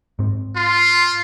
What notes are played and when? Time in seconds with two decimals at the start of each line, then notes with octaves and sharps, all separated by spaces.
0.19 G#2 C4
0.56 F4 C6